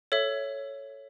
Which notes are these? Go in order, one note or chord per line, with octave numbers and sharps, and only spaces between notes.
A4 C#5 E5